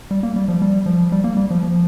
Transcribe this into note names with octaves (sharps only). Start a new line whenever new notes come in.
G3
A#3
G3
F3
G3
F3
G3
A#3
G3
F3
F3